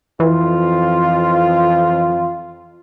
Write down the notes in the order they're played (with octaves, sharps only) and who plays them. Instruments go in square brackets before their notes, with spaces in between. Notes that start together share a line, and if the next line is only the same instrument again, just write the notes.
[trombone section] F2 F4 [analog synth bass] E3